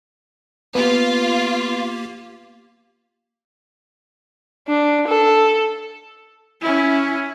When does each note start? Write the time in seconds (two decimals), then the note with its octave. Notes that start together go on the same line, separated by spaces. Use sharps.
0.75 A#3 B3 F4 G4 B4
4.68 D4
5.08 A4
6.61 C#4 E4